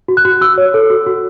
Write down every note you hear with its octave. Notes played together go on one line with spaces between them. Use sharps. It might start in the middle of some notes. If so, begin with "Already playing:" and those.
F#4
F#6
F#4
F#4 E6
C#5
A4
F#4
F#4